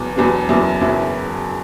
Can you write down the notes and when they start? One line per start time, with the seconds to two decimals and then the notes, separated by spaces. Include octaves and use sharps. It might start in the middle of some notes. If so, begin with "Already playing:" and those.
Already playing: E1 E2 B2 F#3 B3
0.16 E1 E2 B2 F#3 B3
0.49 F#1 E2 B2 F#3 E4
0.81 F#1 E2 B2 F#3 E4